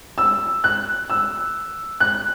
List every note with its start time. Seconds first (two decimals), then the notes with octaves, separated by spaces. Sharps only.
0.18 E6
0.64 F#6
1.10 E6
2.00 F#6